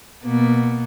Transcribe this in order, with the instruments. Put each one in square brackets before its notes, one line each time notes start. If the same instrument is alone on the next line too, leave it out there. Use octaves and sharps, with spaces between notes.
[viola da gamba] B2 A#3 B3